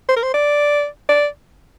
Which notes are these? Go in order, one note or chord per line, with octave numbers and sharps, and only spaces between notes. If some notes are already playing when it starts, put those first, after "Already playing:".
C5
A#4
C5
D5
D5